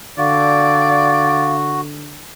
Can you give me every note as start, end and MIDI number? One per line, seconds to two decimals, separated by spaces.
0.18 2.26 50
0.18 1.81 66
0.18 1.59 74
0.18 1.56 77